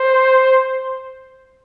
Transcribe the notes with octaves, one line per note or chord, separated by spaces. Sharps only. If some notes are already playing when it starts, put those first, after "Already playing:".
Already playing: C5